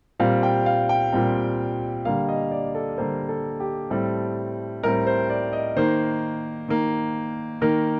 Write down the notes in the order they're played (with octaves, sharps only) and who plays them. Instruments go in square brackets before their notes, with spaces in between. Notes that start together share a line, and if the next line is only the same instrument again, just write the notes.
[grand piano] A#2 G3 C4 F5
G5
F5
G5
A#2 G3 C4
D3 G3 A#3 F5
D#5
D5
A4
D3 G3 A#3 C5
A4
G4
A2 G3 C4 A4
A2 G3 C4 A#4
C5
D5
D#5
D#3 A#3 C5
D#3 A#3
D#3 A#3 A#4